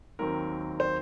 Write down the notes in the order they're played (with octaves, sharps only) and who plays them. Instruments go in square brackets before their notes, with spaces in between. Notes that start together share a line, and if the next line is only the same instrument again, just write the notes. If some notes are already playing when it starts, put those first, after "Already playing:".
[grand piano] D#2 D#3 F#3 C4 A#4
C5